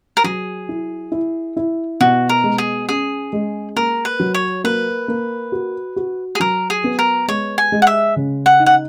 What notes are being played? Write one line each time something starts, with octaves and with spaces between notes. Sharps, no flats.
A#4
F#3 G#4
E4
E4
E4
B2 F#4
A#4
G#3
G#4
C#4 G#4
G#3
A#3 A#4
B4
F#3
C#5
A#3 B4
A#3
F#4
F#4
G#4
F#3 A#4
G#4
B3
A#4
G#3 C#5
G#5
G#3
F#5
E5
C#3
F#5
D#4
F#5